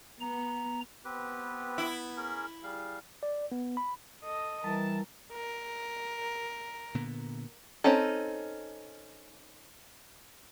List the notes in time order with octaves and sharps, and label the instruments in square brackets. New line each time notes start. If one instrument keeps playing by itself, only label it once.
[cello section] B3 [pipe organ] A#5
[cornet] B3 [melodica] C4 G4 B4
[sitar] E4
[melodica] C#4 G#4 A#4
[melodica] G3 F5 [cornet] G#4
[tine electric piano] D5
B3
B5
[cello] A4 D#5
[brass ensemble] E3 A5 [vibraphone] G3 E4 [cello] A#4
[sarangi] A#4
[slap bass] A#2 D3 B3
[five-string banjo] C4 C#4 D#4 A4